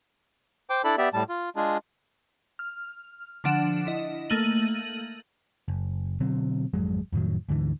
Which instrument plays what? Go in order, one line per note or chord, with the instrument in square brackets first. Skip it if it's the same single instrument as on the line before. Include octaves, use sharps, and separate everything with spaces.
[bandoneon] C5 G5 D6
D4 E4 A4 D5 B5
B3 G4 D5 E5
A2 G3 A5
F4
G#3 D4 F4 G#4
[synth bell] F6
D3 F3 D4 F#5 E7
E4 D#5
A3 A#3 D#7 F#7
[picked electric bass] F#1
B2 D3 F#3 C4
G#1 F2 F#3 G#3
F2 A2 D#3 F#3
D2 G#2 D3 E3